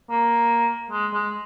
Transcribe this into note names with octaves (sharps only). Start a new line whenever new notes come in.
A#3
G#3
G#3